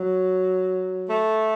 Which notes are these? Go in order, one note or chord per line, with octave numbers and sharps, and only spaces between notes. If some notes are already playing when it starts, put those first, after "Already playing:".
Already playing: F#3
A3